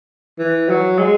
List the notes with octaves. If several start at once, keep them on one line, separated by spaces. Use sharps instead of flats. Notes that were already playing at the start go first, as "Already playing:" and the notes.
E3
F#3
G#3